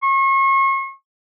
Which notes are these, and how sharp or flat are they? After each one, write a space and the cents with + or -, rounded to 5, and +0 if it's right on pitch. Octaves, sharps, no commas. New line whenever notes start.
C#6 -40